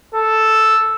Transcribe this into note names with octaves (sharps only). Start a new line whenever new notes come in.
A4